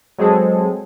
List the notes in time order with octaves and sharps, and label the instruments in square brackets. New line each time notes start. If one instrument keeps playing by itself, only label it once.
[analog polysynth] F#3 G#3 C4 G#4 A4